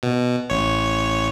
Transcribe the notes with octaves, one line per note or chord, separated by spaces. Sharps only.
B2
A1 C#5